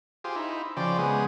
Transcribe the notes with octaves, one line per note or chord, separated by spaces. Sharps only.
F4 G4 G#4 C5
D#4 E4
C#3 F3 C5 D5 G5
C#3 G#3 B3 G#4